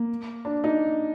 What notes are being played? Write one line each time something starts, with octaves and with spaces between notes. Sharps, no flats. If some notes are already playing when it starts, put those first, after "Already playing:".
Already playing: A#3
D4
D#4